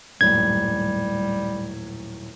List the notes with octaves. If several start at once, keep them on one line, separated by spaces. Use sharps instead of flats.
D#1 F#2 A2 G3 G#6